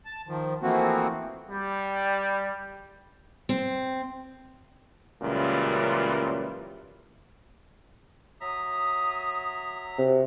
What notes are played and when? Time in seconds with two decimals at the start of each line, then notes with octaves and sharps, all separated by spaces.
0.05 A5
0.27 D#3 F3
0.62 E3 F3 A3 A#3 C4 F#4
1.48 G3
3.49 C4
5.22 C#2 F#2 A#2 E3 G3
8.41 F#3 E5 A#5 D#6
9.99 C3 F#4